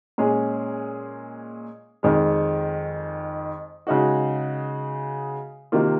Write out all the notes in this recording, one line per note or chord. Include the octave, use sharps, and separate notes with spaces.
A#2 G#3 C#4 G#4
F2 D#3 G#3
C#3 G#3 D#4 F#4
C3 D#3 A#3 F4